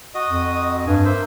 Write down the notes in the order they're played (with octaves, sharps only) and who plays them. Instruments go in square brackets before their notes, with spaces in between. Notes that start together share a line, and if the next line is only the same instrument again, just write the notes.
[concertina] F#4 D#5 D#6
[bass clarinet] F2
[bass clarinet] G2 [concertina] G#5
[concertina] A#3 C5 E5